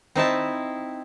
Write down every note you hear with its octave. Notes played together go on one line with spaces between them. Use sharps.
C4 D#4 E4 A5